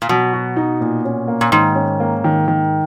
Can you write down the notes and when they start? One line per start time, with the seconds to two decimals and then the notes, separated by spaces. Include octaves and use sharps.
0.02 A#2
0.09 B2 F#3
0.33 F#4
0.56 D#4
0.81 A#2
1.05 C#4
1.28 A#3
1.41 A#2
1.52 G#2 D#3
1.76 C#4
2.00 A#3
2.24 D#3
2.48 D#3